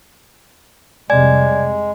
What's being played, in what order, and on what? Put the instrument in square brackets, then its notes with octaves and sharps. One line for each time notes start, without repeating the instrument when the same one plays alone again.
[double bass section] F2 C3 G3 [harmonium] G#3 [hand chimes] D5 G#5 G#6